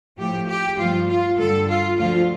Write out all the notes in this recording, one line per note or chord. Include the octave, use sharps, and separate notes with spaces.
A2 F3 A3 G4
G4
G2 F3 A3 F4
F4
G2 D3 G3 A4
F4
D2 D3 F3 A3 F4